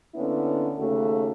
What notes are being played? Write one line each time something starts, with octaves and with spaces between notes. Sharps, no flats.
D3 A#3 B3 C#4 E4
D#2 C#3 A3 F#4 A4